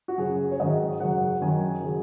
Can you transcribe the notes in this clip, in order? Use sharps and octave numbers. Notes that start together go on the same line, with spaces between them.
F#4
F#2 C#3 F#3 G#4
C#5
G#2 D#3 F#3 D#5
F#2 C#3 F#3 F#5
F#2 D#3 F#3 G#5
C#3 F#3